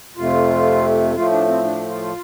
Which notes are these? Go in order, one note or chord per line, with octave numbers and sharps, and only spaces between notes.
F2 C3 A3 F4
A2 F3 A3 F4
D4
C4
D4
F4